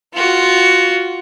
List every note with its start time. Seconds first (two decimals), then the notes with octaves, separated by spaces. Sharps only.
0.15 F4 F#4